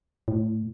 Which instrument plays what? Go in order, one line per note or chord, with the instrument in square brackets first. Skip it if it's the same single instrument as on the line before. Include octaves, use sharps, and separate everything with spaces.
[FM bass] A2